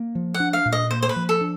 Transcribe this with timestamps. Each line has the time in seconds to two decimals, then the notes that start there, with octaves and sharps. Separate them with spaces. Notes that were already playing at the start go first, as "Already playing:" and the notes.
Already playing: A#3
0.15 F3
0.34 F#5
0.40 D4
0.53 F5
0.65 A#2
0.72 D#5
0.91 A#3 C5
1.02 C5
1.09 B4
1.16 F3
1.29 A4
1.41 D4